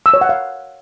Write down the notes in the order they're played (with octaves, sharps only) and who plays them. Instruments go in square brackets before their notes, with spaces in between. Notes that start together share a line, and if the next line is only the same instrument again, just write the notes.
[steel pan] E6
C#5
F#5
F5